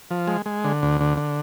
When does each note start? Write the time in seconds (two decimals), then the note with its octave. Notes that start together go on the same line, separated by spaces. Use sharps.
0.10 F3
0.28 G#3
0.46 G#3
0.64 D3
0.82 D2
1.01 D3
1.18 D3